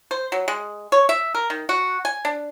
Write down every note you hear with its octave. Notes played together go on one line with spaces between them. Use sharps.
C5
F#3
G#3
C#5
E5
A#4
D#3
F#4
G#5
D4